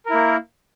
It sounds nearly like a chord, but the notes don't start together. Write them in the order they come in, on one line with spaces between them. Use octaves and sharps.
A#4 E4 A#3